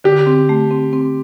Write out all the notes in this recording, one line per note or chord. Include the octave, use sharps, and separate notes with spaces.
D3 G4
C4
A3
C4
C4